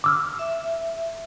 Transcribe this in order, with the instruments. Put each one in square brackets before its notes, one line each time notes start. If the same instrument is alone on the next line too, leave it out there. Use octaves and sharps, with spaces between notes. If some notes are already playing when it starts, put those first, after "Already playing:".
[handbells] D6 E6 F6
[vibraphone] E5